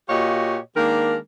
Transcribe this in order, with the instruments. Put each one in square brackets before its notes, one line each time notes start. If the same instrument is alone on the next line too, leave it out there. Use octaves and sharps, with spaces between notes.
[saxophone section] A#2 F#4 G4 C#5 D#5 F5
D#3 G#3 A#3 D4 A#4